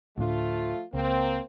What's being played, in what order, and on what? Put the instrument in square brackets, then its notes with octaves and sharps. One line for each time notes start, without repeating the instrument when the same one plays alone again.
[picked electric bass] D2 A2 D4 [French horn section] F3 A3 F4
[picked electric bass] C#2 [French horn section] A#3 C4